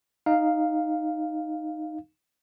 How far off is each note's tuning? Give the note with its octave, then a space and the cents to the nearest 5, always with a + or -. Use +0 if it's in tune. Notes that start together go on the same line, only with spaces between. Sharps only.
D#4 -5 F5 +0